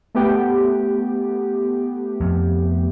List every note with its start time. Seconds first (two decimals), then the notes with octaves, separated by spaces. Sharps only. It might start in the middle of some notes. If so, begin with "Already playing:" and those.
0.15 A3 B3 G4
2.20 F2